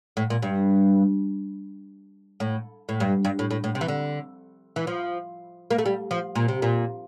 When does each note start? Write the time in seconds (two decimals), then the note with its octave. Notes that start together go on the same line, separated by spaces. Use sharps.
0.17 A2
0.30 A#2
0.42 G2
2.40 A2
2.89 A2
3.00 G2
3.25 G2
3.39 A2
3.51 A2
3.64 A2
3.75 C3
3.81 E3
3.88 D3
4.76 E3
4.87 F3
5.71 A#3
5.78 A3
5.86 G3
6.11 F3
6.35 A#2
6.48 C3
6.62 A#2